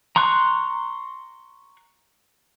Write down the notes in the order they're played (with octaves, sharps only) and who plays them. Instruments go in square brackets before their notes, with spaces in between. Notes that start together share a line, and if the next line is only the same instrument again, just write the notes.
[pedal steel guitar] A#5 C6 C#6 F#6